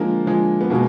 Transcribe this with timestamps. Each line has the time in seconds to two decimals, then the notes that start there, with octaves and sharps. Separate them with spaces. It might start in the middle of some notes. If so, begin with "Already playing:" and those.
Already playing: D3 F3 G#3 A#3
0.25 D3 F3 G#3
0.61 B3
0.70 B2 G#3 A#3